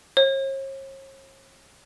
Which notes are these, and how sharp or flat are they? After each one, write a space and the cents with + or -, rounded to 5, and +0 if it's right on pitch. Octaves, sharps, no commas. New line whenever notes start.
C#5 -45